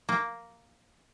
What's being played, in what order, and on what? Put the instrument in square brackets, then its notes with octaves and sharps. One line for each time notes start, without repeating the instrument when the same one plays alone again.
[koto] A#3